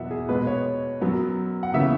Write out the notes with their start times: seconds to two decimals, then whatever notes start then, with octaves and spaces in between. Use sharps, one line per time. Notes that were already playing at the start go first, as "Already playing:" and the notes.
Already playing: E2 B2 F#3 B3 E5 F#5
0.11 G#4
0.29 B2 G#3 B3 B4
0.47 C#5
1.01 F#2 F#3 B3
1.63 F#5
1.74 C#3 E3 B3 E5